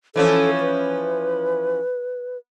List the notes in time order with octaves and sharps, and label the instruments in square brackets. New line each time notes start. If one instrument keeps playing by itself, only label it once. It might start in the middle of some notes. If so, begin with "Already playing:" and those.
[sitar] E3 F3 C#4 [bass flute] A4
[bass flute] B4